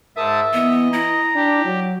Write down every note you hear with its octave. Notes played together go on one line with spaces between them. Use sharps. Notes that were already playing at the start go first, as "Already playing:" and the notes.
G#2 A#4 E5 A5 D#6
E3 B3 D#5
E4 A#5
D4 G4
F#3